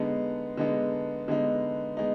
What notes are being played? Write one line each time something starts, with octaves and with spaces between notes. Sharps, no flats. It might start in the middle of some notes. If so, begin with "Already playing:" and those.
Already playing: D3 G#3 B3 D#4
D3 G#3 B3 D#4
D3 G#3 B3 D#4
G#3 B3 D#4